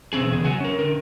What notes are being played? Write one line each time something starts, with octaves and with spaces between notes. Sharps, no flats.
E2 B2 C4 C#4 G#4
E2 C#3 G#4
F#3 F#5 G#5
C#4 A#4
D3 A#4